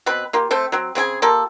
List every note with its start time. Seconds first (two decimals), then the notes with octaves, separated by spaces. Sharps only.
0.06 B2 C4 B4 B5
0.33 A#3 F4 G4
0.51 A3 C4 A4 C5
0.72 F#3 C4
0.95 C#3 C4 G#4 G#5
1.22 A#3 F4 G4 A4